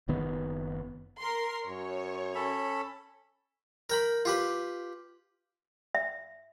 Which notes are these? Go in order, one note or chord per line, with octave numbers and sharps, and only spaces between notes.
F#1 D#3 B3
A#4 C6
F#2 C#5
C#4 A4 B5
A#4 G5 B5
F4 G4 B4
E5